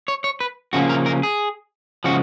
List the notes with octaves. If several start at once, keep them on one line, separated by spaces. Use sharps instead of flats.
C#5
C#5
B4
C#3 F3 A#3 C#4 F#4
A#4
A#4
G#4
C#3 F3 G#3 F#4